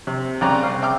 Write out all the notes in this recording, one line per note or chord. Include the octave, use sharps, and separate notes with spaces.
C3
C2 C#3 D5 G5 A#5 F#6
C4 F5
E5 G5 D6 F6